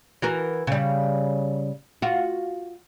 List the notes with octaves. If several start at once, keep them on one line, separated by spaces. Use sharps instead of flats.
E3 F#4 A#4
C#3 G3
F4 F#4